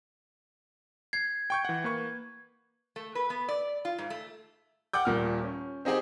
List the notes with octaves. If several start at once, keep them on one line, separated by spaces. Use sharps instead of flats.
G#6 C7
G5 C#6 G6
E3 F#5
A#3 B4 C#6
A3
B4
B3
D5
F4
G#2
A3
F#5 G5 D6 G6
D#1 A#2 F6
C#4
C4 D#4 G4 G#4 G5